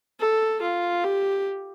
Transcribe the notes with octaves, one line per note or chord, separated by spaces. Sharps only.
A4
F4
G4